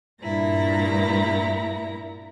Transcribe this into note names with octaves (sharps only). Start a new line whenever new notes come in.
G2 A#2 E4 A#5